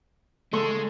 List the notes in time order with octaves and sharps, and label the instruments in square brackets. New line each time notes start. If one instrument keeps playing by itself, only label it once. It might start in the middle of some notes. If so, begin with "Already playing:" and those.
[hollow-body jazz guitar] C#2 A3 C6 [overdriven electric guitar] G#3 [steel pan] A4 C#6